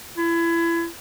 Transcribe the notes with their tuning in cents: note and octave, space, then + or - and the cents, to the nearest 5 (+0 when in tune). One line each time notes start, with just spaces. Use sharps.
E4 +30